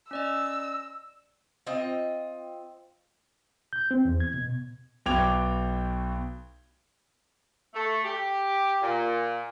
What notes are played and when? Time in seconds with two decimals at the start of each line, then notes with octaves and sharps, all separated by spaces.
0.11 C#4 D5 D#5 E6
1.67 C4 F4 D#5 G5
3.73 G6
3.91 C4
4.05 E2
4.20 G#6
4.34 B2
5.06 B1 B2 G5 D6 G#6 F7
7.74 A3
8.04 G4
8.82 A#2